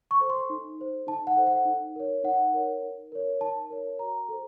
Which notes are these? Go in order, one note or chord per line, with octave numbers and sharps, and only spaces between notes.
C#6
A4 C5
C6
D#4
A4 C5
D#4 A5
F#5
A4 C5
F#5
D#4
A#4 C#5
D#4 F#5
A#4 C#5
D#4
A#4 C#5
D#4 A5
A#4 C#5
F#4 A#5
A4 C5